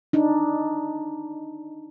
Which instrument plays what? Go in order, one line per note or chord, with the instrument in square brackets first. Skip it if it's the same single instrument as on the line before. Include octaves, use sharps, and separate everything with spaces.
[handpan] D4 D#4